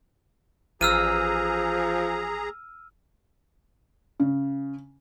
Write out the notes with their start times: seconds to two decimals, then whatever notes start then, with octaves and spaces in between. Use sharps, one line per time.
0.81 A1 F3 G#4 A#5 E6 F6 D#7
4.20 C#3